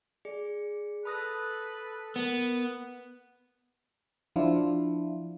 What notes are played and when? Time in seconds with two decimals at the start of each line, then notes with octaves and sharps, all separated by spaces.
0.25 G#4 D5 C#7
1.05 A4 B4 B5 D#6 A#6
2.16 B3 A#4
4.36 F3 D4 E4 F4